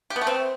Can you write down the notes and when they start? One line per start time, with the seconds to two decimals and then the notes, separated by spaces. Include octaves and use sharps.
0.10 G4
0.16 B3
0.21 A3
0.27 C4